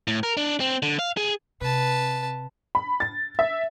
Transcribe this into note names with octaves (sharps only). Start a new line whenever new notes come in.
A2
A#4
D4
C4
D3
F5
G#4
C3 B4 A5
B5
A6
E5